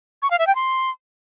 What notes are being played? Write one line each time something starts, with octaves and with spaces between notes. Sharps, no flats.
C#6
F5
E5
G5
C6